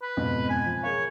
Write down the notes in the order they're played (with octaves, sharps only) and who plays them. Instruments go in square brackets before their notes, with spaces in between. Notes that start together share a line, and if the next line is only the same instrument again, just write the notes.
[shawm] B4
[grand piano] F2 G#2 B2
[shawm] G#5
[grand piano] F3
[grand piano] G#4 A#4 F5 [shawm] C#5